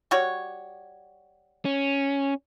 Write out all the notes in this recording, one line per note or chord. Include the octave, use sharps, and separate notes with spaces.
G3 F#4 C#5
C#4